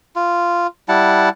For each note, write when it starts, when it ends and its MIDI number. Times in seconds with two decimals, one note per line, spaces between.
0.16 0.67 65
0.89 1.29 55
0.89 1.29 64
0.89 1.29 78
0.89 1.29 81